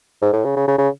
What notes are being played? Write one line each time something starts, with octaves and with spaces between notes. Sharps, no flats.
G#2
A2
C#3
C#3
C#3
C#3